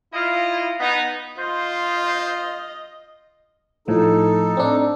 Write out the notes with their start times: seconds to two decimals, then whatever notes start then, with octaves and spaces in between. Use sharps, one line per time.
0.13 E4 F4 D#5
0.80 B3 D#4
1.38 F4 C5 D#5
3.88 A2 F3 D#4 A4
4.57 C4 D4